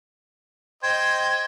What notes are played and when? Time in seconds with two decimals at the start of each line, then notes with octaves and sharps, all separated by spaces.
0.83 C5 D#5 G5 G#6